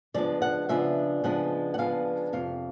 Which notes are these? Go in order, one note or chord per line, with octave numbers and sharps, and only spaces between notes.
C#3 F3 G#3 B3 D4 D5
F#5
C#3 F3 G#3 B3 D4 E5
C#3 F3 G#3 B3 D4 F#5
F#5
C#3 F3 G#3 B3 D4 F5
F2 C3 F5